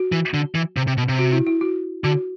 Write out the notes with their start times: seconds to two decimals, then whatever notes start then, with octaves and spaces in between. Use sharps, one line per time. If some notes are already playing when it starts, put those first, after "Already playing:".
Already playing: F#4
0.12 E3
0.34 D3
0.55 E3
0.77 C3
0.87 C3
0.98 B2
1.09 C3
1.19 F#4
1.32 E4
1.47 E4
1.61 F#4
2.04 D3 F#4